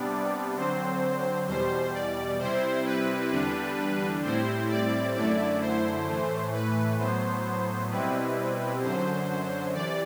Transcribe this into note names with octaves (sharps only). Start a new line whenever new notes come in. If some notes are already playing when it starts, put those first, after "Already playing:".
Already playing: C3 G3 B3 D4 D5
D3 F#3 C4 C5
E2 B2 G3 C5
D5
C3 G3 C4 E4 C5
B4
E2 D3 G3 D4
A2 G3 C4 E4 C5
D5
F#2 D3 A3 E4 D5
C5
A2 E3 A3
B4
A2 F#3 B3 C5
B2 G3 C4 E4 B4
F#2 D3 F#3 C5
C3 E3 D5